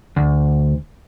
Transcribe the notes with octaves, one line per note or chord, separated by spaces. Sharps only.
D2